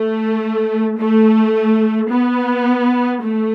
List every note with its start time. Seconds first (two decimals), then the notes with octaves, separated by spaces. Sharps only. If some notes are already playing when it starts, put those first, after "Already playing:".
Already playing: A3
0.98 A3
2.10 B3
3.23 A3